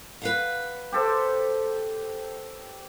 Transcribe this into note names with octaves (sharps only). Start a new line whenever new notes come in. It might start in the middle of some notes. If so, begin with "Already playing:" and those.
B4 F5 F#5
G4 A4 C5